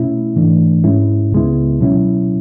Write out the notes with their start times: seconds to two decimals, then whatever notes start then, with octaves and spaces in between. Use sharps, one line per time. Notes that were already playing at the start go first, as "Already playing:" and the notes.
Already playing: B2 A3 C#4 E4
0.36 G#2 E3 A3 D4
0.84 G#2 G#3 C#4 E4
1.32 C#2 C#3 G#3 B3 E4
1.81 B2 F#3 C#4 E4